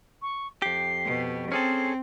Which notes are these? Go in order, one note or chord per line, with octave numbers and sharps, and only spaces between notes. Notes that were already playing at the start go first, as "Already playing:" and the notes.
C#6
F2 G4 C7
B2
C4 C#4 G#4 A4 C7